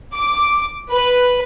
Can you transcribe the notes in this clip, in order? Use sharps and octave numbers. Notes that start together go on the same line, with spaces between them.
D6
B4